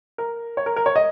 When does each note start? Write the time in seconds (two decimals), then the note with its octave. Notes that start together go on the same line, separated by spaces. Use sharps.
0.18 A#4
0.57 C#5
0.66 A#4
0.76 A#4
0.86 C#5
0.96 D#5